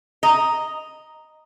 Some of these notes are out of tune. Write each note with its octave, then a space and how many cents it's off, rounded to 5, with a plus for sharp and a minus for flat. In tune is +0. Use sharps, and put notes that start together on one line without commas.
D#5 +0 A#5 +0